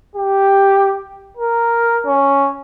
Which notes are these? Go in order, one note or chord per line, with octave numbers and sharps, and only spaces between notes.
G4
A#4
C#4